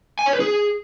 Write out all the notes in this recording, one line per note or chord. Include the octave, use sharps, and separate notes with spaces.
G#5
C#5
B4
G#4